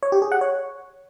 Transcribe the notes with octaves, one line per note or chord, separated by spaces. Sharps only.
C#5
G4
G#4
F#5
C#5